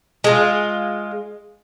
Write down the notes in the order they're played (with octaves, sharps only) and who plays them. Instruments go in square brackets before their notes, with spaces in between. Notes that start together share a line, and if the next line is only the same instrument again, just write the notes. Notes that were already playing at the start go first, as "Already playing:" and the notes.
[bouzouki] G#3 F4